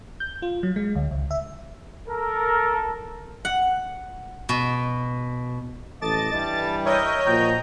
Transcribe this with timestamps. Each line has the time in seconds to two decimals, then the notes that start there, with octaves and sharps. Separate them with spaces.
0.20 G6
0.42 F4
0.63 F#3
0.76 G#3
0.95 D2
1.11 C#2
1.31 E5
2.08 A4 A#4
3.45 F#5
4.49 B2
6.02 A1 A4 D#5 A5 D6 A6
6.34 G2 E3 G3
6.85 A#4 C#5 D#5 E5 G6
7.26 A#2 F3 F#4 G5 A#5